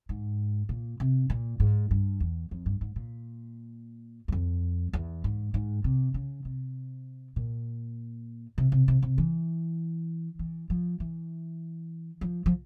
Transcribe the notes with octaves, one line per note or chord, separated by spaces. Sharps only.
G#2
A#2
C3
A#2
G#2
G2
E2
F2
G2
G#2
A#2
E2
F2
E2
G#2
G#2
C3
C#3
C3
A#2
C3
C3
C3
C3
E3
E3
F3
E3
F3
F3